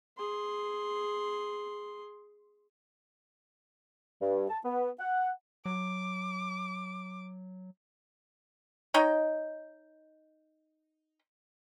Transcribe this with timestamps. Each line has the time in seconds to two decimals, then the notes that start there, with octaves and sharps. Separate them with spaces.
0.18 G#4 C6
4.21 G2
4.50 A5
4.65 B3
5.00 F#5
5.65 F#3 D6
8.94 D#4 C#5 D#5 G5